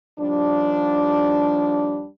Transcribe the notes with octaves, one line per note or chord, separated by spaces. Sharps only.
D#2 F3 G3 D4